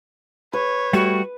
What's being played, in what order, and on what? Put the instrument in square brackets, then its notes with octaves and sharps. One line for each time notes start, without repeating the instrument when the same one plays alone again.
[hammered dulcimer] B4 [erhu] C#5
[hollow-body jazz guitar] G3 A3 [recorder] F#4